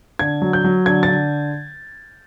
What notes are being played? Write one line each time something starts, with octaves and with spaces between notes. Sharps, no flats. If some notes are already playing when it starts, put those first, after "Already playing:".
D3 G#6
F#3
G6
F#3
D3 G#6
A6
D3